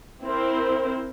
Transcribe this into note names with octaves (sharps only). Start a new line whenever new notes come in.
C4 E4 A#4 C5